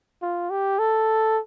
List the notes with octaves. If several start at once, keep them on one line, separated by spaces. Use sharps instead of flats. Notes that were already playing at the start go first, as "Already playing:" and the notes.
F4
G4
A4